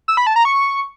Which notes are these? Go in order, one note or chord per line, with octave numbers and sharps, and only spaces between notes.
E6
B5
A5
A#5
C#6